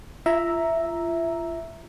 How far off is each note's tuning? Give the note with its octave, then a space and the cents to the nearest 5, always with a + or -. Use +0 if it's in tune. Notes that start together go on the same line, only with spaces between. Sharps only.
F4 -35 E5 +0 A#5 +0